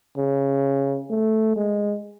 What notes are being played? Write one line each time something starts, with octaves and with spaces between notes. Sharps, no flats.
C#3
A3
G#3